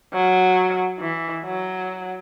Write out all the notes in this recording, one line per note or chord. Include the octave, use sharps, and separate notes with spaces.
F#3
E3
F#3